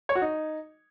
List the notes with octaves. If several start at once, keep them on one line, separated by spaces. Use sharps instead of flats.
C#5
F#4
D#4